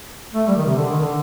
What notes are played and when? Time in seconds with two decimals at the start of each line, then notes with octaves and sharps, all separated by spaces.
0.33 A3
0.47 G3
0.56 D#3
0.66 C3
0.75 D3
0.89 D#3
1.01 D3